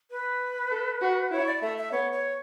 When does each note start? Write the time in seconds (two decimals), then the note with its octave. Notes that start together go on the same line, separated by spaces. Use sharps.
0.11 B4
0.71 A4
1.01 F#4
1.31 E4 C#5
1.47 D5
1.57 D5
1.61 A3 E5
1.77 E5
1.92 B3 C#5
2.12 C#5